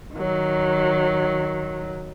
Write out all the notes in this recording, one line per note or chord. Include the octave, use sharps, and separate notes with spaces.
D#3 F#3